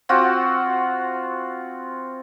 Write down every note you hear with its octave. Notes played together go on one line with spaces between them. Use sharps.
C4 F4 F#4